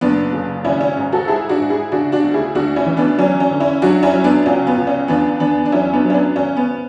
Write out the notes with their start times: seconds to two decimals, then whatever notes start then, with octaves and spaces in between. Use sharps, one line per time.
0.01 F#1 B3 D4
0.33 C#3
0.64 G#1 C#4 E4
0.81 C#4
0.97 G#2
1.12 F#4 A4
1.28 G#2 E4 G#4
1.49 D4 F#4
1.59 G#2
1.70 E4 G#4
1.92 C#3 D4 F#4
2.12 D4 F#4
2.23 D2
2.34 E4 G#4
2.55 D2 D4 F#4
2.76 C#4 E4
2.86 E3
2.97 B3 D4
3.18 F#3 C#4
3.40 C#4
3.50 D3
3.60 C#4 E4
3.82 F#3 D4 F#4
4.03 C#4 E4
4.13 F#3
4.24 B3 D4
4.46 C#2 C#4
4.67 B3
4.77 C#2
4.87 C#4
5.08 E2 B3 D4
5.40 E2 B3 D4
5.65 D4
5.72 F#3 C#4 E4
5.93 B3 D4
6.04 F#3
6.10 C#4
6.14 B3 D4
6.36 G#1 C#4
6.57 B3